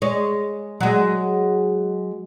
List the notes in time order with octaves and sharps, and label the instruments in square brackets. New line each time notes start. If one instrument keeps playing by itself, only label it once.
[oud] G#3 C#5
F#3 G#3